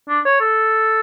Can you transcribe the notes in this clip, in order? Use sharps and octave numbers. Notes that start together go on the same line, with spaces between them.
D4
C#5
A4